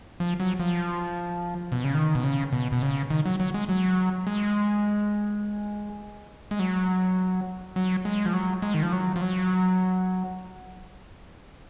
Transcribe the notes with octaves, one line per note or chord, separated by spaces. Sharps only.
F3
F#3
F3
B2
C#3
D#3
B2
C#3
B2
B2
C#3
D#3
F#3
F#3
G#3
F#3
G#3
G#3
F#3
F#3
G#3
F3
F#3
G#3
D#3
F3
F#3
F3
F#3